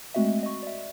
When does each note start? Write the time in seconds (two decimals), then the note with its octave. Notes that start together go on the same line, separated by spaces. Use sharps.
0.14 G#3 A3 C4 F#4 D#5 E5
0.43 D#5 C#6
0.63 D5 E5